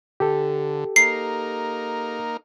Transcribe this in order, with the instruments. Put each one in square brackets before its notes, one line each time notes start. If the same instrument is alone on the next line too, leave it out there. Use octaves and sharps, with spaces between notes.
[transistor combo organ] D3 [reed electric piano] G4 A4
[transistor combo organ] A#3 D#4 A#4 [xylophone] C7